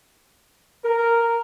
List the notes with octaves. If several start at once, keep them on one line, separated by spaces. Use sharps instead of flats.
A#4